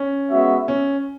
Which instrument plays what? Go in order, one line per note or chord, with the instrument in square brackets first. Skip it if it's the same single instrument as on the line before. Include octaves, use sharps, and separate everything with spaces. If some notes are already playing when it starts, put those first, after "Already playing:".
Already playing: [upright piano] C#4
[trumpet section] G#3 B3 F#4 E5
[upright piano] C#4